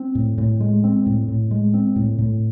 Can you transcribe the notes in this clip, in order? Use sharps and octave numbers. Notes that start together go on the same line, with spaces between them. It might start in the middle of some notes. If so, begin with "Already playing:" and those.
Already playing: C4
A2
A2
G#3
C4
A2
A2
G#3
C4
A2
A2